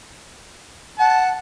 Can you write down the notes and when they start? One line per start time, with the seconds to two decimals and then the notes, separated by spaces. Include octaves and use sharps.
0.99 F#5 A5